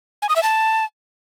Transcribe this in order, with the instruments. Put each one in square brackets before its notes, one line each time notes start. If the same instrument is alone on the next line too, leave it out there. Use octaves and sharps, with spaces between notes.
[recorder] G#5
D#6
E5
A5